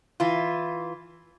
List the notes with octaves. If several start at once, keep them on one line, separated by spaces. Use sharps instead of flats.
E3 F4